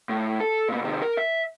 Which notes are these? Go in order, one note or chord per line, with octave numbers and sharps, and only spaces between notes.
A2
A4
A#2 B3
C3 D#3
A#4
E5